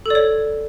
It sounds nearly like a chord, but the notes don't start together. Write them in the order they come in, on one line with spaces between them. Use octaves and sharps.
A4 D5 C#5